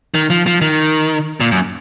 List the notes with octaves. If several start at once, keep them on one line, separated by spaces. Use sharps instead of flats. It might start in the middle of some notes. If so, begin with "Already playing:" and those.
D#3
F3
F3
D#3
A#2
F#2